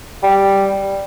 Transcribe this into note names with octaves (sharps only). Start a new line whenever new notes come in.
G3